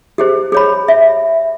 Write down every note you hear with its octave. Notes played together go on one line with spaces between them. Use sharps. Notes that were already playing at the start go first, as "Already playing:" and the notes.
G4 G#4 C5
G#4 C#5 B5
E5